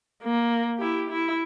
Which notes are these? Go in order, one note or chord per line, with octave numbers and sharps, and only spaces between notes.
A#3
E4 G4
E4